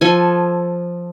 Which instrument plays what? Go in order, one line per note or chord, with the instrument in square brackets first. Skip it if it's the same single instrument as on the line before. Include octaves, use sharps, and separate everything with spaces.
[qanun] F3 A4 G#5